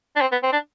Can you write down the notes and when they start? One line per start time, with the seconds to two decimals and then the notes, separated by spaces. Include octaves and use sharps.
0.16 D4
0.21 C4
0.32 B3
0.43 C4
0.53 D4